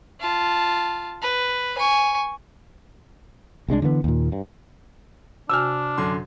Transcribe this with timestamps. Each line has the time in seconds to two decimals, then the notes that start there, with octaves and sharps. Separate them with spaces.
0.20 F4 A5
1.22 B4
1.78 G#5 C#6
3.68 C2 G#3 C#4 D4
3.82 D3 E3 A3 B3
4.04 D#2 A#2
4.32 G2
5.50 C3 D4 F#4 G#5 E6 F6
5.98 F#2 D3 C6